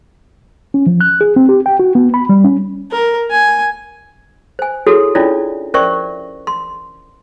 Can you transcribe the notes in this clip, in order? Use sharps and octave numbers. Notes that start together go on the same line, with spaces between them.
C#4
F3
F#6
G#4
C4
G4
G5
F#4
B3
B5
G3
C#4
A#4
G#5
C5 G#5
E4 F#4 G#4 A4 C#5
C#4 D4 E4 F4 C#5 D5
C#4 A#4 C5 D5 E5 C#6
C6